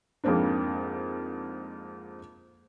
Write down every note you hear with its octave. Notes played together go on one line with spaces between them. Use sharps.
F2 G#2 A#3 C4 D4